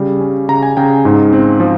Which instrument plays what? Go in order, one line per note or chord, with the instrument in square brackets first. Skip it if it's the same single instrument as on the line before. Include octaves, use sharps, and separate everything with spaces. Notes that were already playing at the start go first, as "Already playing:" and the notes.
Already playing: [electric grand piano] C#3 G3
C#4
C#3 A#5
G#5
C#3 G5
G#2
C4
F3